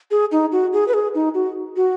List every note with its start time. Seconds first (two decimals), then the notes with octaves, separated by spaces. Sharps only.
0.11 G#4
0.32 D#4
0.52 F#4
0.73 G#4
0.88 B4
0.94 G#4
1.15 D#4
1.34 F#4
1.76 F#4